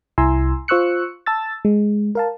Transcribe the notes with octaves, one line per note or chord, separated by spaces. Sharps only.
C2 E4 G#5 A#5 C6 E6
F4 C5 C#6 E6 F#6 C#7
A5 E6 A6
G#3
A#4 F5 A5